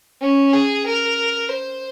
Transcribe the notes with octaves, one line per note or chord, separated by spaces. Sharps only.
C#4
G#4
A#4
C5